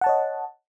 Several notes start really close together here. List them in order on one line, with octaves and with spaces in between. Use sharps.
F#5 A5 C#5 D#5